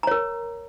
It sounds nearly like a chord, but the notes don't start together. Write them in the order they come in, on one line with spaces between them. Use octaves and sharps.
A#5 C#5 A#4